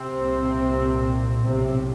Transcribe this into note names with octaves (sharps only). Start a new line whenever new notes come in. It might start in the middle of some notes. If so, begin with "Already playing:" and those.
Already playing: C3 C4
C2 A#2
B1 A2 C3 C4